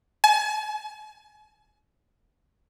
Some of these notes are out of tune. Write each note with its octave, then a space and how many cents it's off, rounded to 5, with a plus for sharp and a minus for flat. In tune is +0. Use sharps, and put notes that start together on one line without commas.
G#5 +45